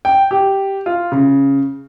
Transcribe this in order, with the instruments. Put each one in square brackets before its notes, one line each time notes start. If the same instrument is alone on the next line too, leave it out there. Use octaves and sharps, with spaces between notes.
[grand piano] G5
G4
F4
C#3